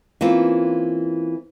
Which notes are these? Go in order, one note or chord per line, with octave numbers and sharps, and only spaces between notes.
E3 A#3 C4 C#4 F4